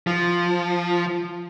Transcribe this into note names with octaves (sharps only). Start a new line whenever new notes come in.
F3